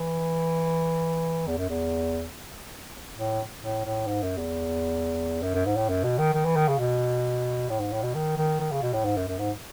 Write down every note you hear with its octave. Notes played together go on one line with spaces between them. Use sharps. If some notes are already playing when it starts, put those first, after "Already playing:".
Already playing: E3
E2
F#2
E2
A2
A2
A2
G#2
F#2
E2
F#2
F#2
G#2
A2
F#2
B2
D#3
D#3
E3
D#3
C#3
B2
A2
G#2
A2
B2
D#3
D#3
D#3
C#3
B2
A2
G#2
F#2
F#2
G#2